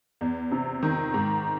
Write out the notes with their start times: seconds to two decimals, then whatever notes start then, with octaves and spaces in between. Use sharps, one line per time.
0.21 E2
0.51 C3
0.83 D#3
1.14 G#2